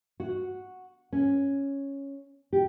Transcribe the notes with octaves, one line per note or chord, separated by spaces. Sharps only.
F#4
C#4
G4